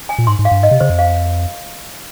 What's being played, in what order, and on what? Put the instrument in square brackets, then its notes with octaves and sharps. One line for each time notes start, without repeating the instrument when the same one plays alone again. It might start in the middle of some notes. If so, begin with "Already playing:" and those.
[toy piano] G#5
[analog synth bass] A#2
[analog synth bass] G#2 [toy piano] C6
[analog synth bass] G#2
[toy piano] F5
[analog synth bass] G2
[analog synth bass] G#2 [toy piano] D#5
[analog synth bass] C3
[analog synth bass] C#3 [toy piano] C5
[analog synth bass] F2
[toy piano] F5